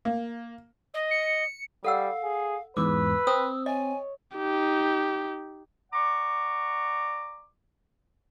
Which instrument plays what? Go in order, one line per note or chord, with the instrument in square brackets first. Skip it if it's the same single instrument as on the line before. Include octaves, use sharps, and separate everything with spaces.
[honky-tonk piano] A#3
[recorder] D#5
[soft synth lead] C#7
[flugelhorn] G3 [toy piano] A4 F#5 E6 [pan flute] F5
[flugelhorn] G#4
[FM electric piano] E2 G#2 [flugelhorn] B4 [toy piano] D6 [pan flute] E6
[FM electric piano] C4 [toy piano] D#6
[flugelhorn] C#5 [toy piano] D#5 [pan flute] G#5
[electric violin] D#4 G4
[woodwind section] D5 F#5 A#5 C#6 D6